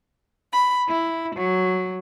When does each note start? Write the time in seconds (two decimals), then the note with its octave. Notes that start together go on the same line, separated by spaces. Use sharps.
0.52 B5
0.87 E4
1.34 F#3